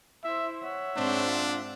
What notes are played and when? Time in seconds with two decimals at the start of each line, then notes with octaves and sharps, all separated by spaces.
0.24 E4 C5 E5
0.63 C#5 E5 F#5
0.97 G#2 C4 D4 C5
1.25 F4